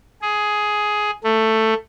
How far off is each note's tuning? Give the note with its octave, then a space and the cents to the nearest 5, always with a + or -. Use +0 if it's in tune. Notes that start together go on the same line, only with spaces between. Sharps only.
G#4 +10
A3 +10